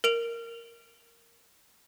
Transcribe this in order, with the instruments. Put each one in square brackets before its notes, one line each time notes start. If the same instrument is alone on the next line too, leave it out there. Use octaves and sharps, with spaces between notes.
[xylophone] A#4 D7 F7